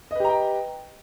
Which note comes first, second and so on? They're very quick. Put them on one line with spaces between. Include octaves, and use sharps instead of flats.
D#5 B4 G4 A#5 G5